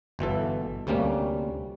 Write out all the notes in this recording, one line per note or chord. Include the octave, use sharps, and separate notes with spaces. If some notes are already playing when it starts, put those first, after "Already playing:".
G1 B2 E3 A4
D2 C3 G3 A#3 C#4